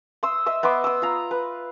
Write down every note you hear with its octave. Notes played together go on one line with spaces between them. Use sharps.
C6 D#6 E6
D#5 E5 E6
B3 D#5 C6 D6
D#6 E6
F4 A#5
B4